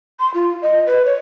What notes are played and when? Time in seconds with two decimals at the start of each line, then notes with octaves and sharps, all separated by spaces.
0.20 C6
0.34 F4
0.62 D#5
0.86 B4
1.05 C#5